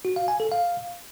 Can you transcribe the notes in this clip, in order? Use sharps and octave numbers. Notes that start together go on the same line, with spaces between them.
F#4
F5
G#5
A4
F5